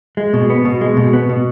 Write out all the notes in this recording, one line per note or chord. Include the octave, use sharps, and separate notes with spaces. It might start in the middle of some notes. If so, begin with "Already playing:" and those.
G#3
B2
B3
B2
G#3
B2
B3
B2